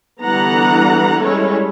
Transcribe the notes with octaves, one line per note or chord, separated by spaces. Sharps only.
D3 E3 G3 B3 F#5 A#5
G3 G#3 C#4 E4 A4 C#5